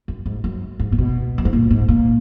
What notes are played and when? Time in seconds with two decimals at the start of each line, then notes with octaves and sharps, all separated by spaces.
0.08 F#2
0.26 G#2
0.44 F#2
0.79 G#2
0.92 A#2
0.98 B2
1.38 F#2
1.45 G#2
1.53 A#2
1.71 G#2
1.88 A#2